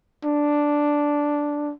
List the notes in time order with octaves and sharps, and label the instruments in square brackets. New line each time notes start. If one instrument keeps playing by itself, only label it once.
[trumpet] D4